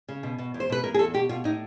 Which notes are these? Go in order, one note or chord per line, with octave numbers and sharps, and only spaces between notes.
C#3
B2
B2
E2
C5
B2 B4
E2 A#4
G#4
E2 A4
B2 G4
B2 F4
A2 D#4